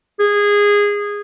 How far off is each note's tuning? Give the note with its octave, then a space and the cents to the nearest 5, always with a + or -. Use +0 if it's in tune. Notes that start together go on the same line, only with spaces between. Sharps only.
G#4 -15